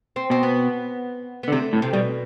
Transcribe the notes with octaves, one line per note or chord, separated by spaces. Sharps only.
C4
B2 C4
B3
B3
D3
C3 A3
A2
C3
B2 G3